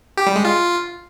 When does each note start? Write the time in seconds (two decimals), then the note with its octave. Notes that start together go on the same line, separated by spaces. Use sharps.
0.17 G4
0.27 G3
0.36 G#3
0.45 F4